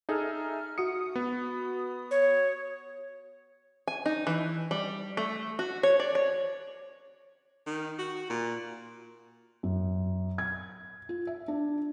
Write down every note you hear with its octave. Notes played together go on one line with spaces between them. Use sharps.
D#4 G#4 A4 E5 F6
F#4 D#6 C#7
B3
C#5
G#5
D#4
E3
G3
A3
F#4
C#5
D5
C#5
D#3
F#4
A#2
F#2
G#6
F4
E5
D4